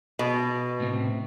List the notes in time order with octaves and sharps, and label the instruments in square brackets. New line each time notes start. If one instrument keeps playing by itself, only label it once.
[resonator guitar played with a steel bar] B2
[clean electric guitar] A2 C3